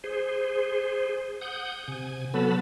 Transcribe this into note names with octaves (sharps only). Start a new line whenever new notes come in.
G#4 C5
F#5 D#6 G6
C3 G#5
F#3 B3 A4 A5 B5